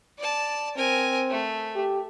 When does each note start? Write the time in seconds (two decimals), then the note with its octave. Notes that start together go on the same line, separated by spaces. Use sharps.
0.18 D5 A5
0.77 C4 A#4 G#5
1.30 A3
1.75 G4